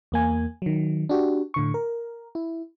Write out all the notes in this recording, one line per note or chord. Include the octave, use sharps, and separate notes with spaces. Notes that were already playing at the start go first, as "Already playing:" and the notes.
E2 A#3 G#5
D#3 F#3
D4 F#4 G4
A2 D3 C#6
A#4
E4